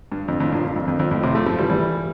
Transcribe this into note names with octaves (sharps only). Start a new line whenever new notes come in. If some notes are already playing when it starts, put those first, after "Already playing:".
G2
F2
F2 A2
G2 A#2
G2
F2
F2
F2
F2 A2
A2 C3
F3 A3
F3 A3
E3 G3
E3 G3